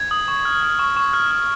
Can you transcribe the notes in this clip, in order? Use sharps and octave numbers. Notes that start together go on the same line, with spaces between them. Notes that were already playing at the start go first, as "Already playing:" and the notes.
Already playing: G#6
D#6
C#6
F6
F6
C#6
C#6
F6
F6